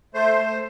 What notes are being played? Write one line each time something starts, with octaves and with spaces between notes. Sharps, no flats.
A3 C5
A3